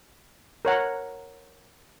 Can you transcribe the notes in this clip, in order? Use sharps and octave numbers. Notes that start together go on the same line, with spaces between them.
A#4 C#5 F#5 A#5